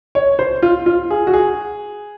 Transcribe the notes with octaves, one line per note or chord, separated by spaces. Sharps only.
C#5
C5
F4
F4
G#4
F#4
G#4